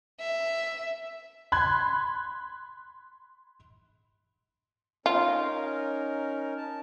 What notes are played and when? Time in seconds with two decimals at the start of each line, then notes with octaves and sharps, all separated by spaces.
0.20 E5
1.52 B5 C6 F#6 G#6
5.06 C#4 D#4 F4 A#4
6.57 A5